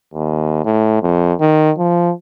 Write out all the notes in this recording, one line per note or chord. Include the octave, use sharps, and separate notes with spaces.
D#2
A2
F2
D#3
F3